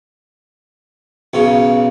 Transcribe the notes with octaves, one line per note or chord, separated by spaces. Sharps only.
B1 C#3